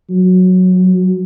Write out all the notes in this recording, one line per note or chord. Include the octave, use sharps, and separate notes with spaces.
F#3